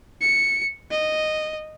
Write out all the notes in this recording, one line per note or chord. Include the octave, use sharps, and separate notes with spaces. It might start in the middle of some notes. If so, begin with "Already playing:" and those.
C#7
D#5